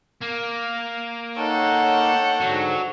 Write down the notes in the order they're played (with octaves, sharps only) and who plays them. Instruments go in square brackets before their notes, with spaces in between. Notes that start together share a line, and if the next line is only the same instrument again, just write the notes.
[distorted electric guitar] A#3
[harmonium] D#4 [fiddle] A4 [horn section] C#5 F#5 G5
[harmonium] G#2 D3 [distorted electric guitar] F#3